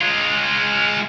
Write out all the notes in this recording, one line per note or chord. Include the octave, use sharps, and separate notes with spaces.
G#3 F4